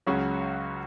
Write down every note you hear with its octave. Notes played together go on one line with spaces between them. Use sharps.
C#2 C#3 F#3 C#4 F#4